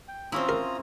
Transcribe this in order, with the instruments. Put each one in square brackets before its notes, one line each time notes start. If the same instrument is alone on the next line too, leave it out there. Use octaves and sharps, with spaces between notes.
[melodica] G5
[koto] C4 C#4 E4 [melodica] F4 A#5 D#6
[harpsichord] A#4